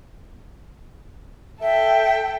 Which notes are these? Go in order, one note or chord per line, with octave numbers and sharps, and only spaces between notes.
A4 E5 G5